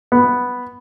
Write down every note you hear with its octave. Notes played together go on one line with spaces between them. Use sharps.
B3